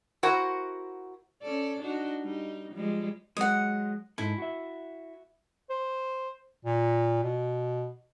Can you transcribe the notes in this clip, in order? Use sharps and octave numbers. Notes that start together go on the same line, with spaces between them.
E4 F#4 A#4 C5 F#5
C#4 A4 D5
D4 D#4 F#4
G3 D#4
F3 G3 G#3
F#3 G#3 D#5 F#5
G#2 D#4 E4 A4
F#4 E5
C5
A#2
B2